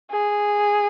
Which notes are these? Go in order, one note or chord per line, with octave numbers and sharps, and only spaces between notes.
G#4